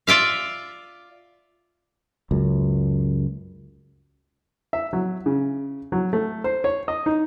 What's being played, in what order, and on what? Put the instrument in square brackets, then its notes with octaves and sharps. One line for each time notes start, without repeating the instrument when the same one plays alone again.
[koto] F4 D5 E5 F5
[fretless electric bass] C#2 F#2
[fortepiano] E5
F#3
C#3
F#3
A3
C5
C#5
D#5
D#4